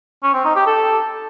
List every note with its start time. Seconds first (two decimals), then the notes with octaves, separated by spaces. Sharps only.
0.23 C#4
0.34 C4
0.45 D#4
0.56 G4
0.66 A4